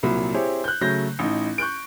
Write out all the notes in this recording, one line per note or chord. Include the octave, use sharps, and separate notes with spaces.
C2 A#2 F#3 B5
C4 E4 G4 G#4 C#5
F#6 G6
C#3 F#3 A3 G6 A#6
A1 D#4
C#6 F#6 G6 D7